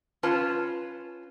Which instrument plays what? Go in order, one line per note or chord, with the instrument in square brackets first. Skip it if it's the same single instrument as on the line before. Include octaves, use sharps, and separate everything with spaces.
[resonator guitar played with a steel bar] C#4 F4 B4 A5